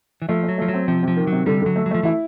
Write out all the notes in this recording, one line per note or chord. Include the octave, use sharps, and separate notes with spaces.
E3
F3 A3
A3
F#3
F3 A3
F#3
C4
C3 F3
C3 F3
D#3
C3 F#3
D3 G3
D3 F#3
A3
F#3
F3 A3
E3 E4